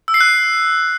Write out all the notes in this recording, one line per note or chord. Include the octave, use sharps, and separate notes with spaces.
E6
C7
F#6